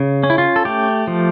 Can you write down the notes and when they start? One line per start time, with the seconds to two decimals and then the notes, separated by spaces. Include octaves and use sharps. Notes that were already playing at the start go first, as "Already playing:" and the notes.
Already playing: C#3
0.23 C#4
0.30 E4
0.38 F4
0.56 A4
0.65 A3 G4
1.07 F3